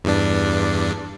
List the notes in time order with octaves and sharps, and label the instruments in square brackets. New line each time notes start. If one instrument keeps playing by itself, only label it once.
[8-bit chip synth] E2 G2 D4